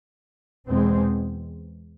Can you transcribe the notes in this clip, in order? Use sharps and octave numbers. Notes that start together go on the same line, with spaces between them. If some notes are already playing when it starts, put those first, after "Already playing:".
E2 B2 G#3 C4